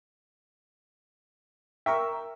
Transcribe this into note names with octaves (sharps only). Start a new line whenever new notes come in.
A#4 E5 G5 C#6